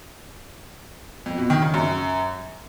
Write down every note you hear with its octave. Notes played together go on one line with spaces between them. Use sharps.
F2
B2
D#3
C#3
F#2